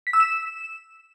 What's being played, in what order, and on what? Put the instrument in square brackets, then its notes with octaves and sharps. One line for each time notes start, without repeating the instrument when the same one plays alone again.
[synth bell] B6
E6
E7